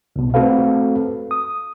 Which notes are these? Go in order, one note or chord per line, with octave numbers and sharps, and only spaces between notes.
C2 B2
A3 C4 F#4 A4 B4 F5
D#6